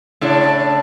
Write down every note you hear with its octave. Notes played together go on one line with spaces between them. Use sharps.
A2 C#3 D4